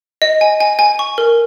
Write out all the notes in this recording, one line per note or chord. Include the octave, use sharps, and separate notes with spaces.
D#5
G#5
G#5
G#5
C#6
A#4